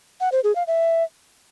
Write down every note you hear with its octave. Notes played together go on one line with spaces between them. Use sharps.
F#5
C5
G#4
F5
E5